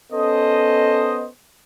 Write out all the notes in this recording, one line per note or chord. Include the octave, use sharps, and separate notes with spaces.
B3 C#4 A4 C5 D#5